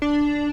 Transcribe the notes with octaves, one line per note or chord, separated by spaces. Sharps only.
D4